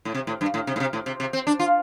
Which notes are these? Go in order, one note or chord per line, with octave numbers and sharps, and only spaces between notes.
A2
C3
A2
G2
A2
C3
A2
C3
A2
C3
C3
C4
D4
F4